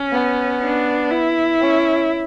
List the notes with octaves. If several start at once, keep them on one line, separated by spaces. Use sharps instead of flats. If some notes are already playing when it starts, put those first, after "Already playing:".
Already playing: C#4
B3
D4
E4
C#4